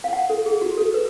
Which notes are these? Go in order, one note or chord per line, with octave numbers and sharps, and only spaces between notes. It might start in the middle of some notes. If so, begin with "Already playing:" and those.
F5
F#5
A4
G#4
F#4
A4
B4